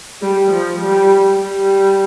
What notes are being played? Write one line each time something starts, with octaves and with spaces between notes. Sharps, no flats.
G3
F3
G3
G3